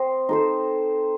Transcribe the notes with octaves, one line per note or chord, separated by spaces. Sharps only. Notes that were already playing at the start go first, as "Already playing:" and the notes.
Already playing: C4 C5 D#5
D#4 A4 C5